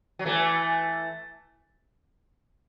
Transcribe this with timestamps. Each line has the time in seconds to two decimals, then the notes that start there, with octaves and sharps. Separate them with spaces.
0.19 F#3
0.26 E3 A3